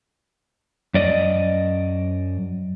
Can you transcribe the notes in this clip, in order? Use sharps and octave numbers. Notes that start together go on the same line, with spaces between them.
F#2 D5 D#5